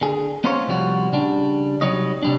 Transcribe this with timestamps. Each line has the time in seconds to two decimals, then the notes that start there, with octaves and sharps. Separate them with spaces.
0.01 D3 G#4
0.44 B3 C#4 D#4 F4 C5 C#5
0.68 C2 F3 G3 F#4
1.12 C#3 G3 D4
1.81 C3 F#3 G3 D#4 C#5 D#5
2.23 C3 G3 D4